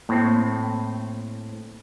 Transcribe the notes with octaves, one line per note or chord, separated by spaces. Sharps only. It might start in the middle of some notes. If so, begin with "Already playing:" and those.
A2 A#3 C4